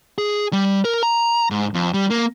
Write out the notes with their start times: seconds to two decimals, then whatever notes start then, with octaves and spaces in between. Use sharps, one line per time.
0.18 G#4
0.53 G3
0.85 A#4
1.03 A#5
1.50 G#2
1.74 F2
1.94 G3
2.10 A#3